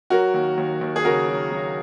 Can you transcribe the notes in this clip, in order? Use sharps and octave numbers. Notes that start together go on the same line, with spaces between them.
F#3 F#4 A#4
D#2
D#2
D#2
G#4
C#3 F#4 A#4
F#3
F#3